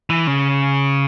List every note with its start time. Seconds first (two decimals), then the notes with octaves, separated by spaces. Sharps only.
0.10 E3
0.27 C#3